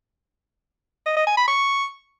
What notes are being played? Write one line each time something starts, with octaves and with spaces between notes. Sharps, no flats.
D#5
D#5
G#5
B5
C#6